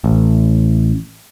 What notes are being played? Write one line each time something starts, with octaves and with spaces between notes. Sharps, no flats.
A1